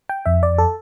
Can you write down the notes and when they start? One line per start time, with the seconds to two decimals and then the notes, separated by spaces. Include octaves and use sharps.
0.09 G5
0.26 F2 E5
0.43 D5
0.58 A4